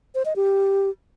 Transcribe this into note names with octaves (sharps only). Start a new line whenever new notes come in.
C5
D#5
G4